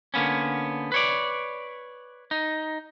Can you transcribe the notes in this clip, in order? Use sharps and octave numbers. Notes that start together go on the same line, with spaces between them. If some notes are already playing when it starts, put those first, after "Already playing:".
D3 A#3 B3 C#4
B4 C#5 D5
D#4